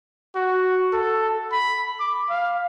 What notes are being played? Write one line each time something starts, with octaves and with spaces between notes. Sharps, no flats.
F#4
A4
B5
D6
F5